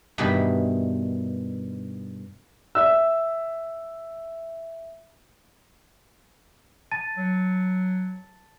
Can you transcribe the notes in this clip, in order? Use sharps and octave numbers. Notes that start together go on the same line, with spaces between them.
G2 B2 D#3 E3 B5
E5 E6
A5 A6 D#7
F#3